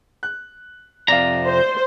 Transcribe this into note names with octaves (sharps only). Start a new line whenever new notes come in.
F#6
F2 C3 D5 F5 A#5
C5